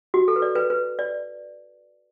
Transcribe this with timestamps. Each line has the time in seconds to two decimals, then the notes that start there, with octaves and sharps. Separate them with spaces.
0.14 F#4
0.28 A4
0.36 B4
0.42 D5
0.55 B4
0.70 B4
0.99 D5